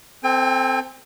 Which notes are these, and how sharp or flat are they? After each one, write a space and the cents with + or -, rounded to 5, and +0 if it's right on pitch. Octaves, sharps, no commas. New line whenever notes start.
C4 -5 A4 +0 G5 +45